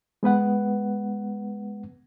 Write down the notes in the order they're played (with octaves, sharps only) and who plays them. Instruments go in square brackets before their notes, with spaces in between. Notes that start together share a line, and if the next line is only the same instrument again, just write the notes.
[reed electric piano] G#3 B3 B4 F#5